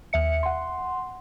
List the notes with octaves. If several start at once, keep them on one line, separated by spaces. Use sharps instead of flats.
D#2 E5 C#7
F#5 C6